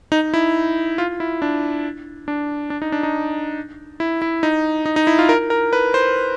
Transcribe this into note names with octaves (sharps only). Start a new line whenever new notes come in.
D#4
E4
F4
E4
D4
D4
D4
D#4
D4
D#4
E4
E4
D#4
D#4
D#4
E4
F4
A#4
A#4
B4
C5